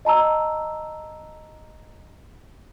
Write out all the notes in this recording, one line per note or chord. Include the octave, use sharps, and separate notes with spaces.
D#5 A5 A#5 E6